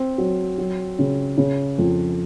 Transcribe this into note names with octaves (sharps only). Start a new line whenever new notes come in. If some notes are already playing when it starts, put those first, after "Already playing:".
Already playing: C4
F#3
F#3
C#3
C#3
F2